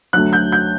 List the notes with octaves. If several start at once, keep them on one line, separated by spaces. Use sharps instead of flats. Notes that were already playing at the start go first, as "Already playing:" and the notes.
D2 D3 F#3 F#6
G6
G6